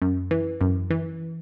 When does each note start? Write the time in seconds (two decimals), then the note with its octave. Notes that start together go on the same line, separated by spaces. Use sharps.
0.02 F#2
0.31 E3
0.61 F#2
0.91 E3